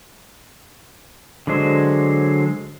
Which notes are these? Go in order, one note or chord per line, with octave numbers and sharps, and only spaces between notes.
D3 F#3 G#3 C5